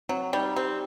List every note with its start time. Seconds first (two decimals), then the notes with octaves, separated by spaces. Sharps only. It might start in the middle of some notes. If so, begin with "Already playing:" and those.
0.09 F#3 C4
0.33 G3 D#4
0.56 C4 G4